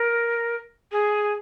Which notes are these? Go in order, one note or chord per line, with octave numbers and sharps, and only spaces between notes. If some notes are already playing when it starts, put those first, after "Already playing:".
Already playing: A#4
G#4